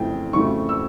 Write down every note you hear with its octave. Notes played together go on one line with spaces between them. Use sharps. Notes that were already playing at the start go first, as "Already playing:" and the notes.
Already playing: F2 C#3 E3 A3 G5
F2 C#3 E3 A3 C#6
E6